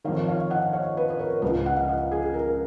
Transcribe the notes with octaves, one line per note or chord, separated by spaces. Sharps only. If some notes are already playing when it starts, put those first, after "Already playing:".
F2 D#3 C#5 F5
C#5 F5
D#5 F#5
C#5 F5
B4 D#5
D#5
A#4 C#5
C#2 C#3 B4 D#5
D#5 F#5
F5
D#5 F#5
G#4
G#4
A#4